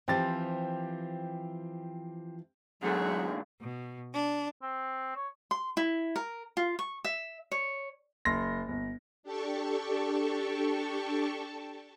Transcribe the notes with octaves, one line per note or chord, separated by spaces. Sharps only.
E3 F3 C4 G4 A6
E2 G#2 D3 F#3 A3 G#4 F#5
B2
D4
C4
C#5
C6
E4
A#4
F4
C#6
E5
C#5
F#1 C6 A#6
G1
D4 G4 A4 A5 C#6